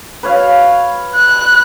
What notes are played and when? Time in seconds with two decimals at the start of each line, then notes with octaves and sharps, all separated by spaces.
0.23 B4 C#5 F5
1.16 F#6